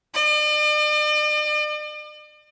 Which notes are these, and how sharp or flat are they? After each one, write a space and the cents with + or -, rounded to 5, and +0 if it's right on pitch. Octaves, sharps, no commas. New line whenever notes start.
D5 +45